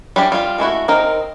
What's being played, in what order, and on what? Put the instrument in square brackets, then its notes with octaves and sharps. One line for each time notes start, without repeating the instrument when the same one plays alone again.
[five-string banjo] G3 C#4 D4 E4 G4
G3 F4 F5
G#3 A3 E4 F#4
C4 D#4 A#4